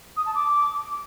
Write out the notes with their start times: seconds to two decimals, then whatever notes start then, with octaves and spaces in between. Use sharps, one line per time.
0.17 D#6
0.26 A5
0.35 D6